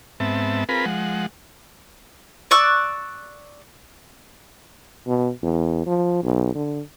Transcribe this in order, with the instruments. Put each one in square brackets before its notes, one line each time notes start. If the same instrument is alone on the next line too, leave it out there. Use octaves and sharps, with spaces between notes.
[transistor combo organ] G#2 B3 C4 E5 A5
C4 F4 G#4 A#4 B4 B5
F3 G#3 F#5
[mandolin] D5 C#6 E6 F#6
[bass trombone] B2
E2
F3
B1
D3